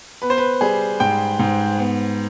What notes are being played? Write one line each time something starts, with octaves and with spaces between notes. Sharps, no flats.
B3 B4
C5
B4
G3 G#4
G#2 G5
G#2
B3